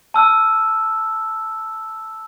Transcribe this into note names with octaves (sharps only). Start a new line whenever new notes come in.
A5 E6 F6